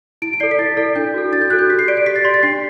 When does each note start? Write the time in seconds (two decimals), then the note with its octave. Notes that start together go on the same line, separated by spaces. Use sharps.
0.22 E4 D7
0.33 D7
0.40 A4 D5 C7
0.51 B6
0.59 E4 A6
0.77 A4 D5
0.96 D4 G6
1.14 F#4 A4
1.33 D4 A6
1.41 G6
1.50 F#4 A4 F#6
1.59 G6
1.70 G4 B6
1.79 C7
1.88 D5 D7
1.97 C7
2.06 G4 B6
2.16 A6
2.25 D5 C6
2.34 A6
2.43 D4 C7